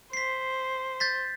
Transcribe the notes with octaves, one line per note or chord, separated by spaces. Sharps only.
C5 B6 C7
G6 A6 B6